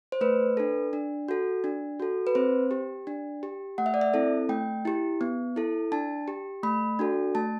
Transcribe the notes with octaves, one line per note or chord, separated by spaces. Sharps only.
C5
A3 B4
D4 A4
D4
F#4 A4
D4
F#4 A4
B4
C4 C5
G4
D4
G4
A3 F#5
E5
D5
E5
C4 E4 A4
A3 G5
E4 G4
B3
E4 A4
D4 A5
G4
A3 B5
D4 F#4 A4
A3 A5